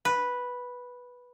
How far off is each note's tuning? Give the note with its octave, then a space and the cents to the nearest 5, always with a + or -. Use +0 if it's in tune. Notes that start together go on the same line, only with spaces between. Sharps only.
B4 -5